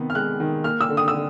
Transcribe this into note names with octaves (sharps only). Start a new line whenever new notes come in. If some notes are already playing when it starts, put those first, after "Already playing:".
Already playing: C3 D#3 B3
F6
G#3 F#6
D#3
A#3 F6
E6
D3
D#6
E6
D3